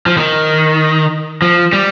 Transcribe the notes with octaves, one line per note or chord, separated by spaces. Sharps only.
F3
D#3
F3
G3